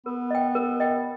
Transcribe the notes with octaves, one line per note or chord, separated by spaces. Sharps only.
B3 A#4
D#5 G5
A#4
D#5 G5